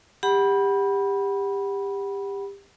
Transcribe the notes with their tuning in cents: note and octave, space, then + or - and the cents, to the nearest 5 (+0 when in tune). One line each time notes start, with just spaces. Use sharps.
G4 +25 F#5 +20 B5 -15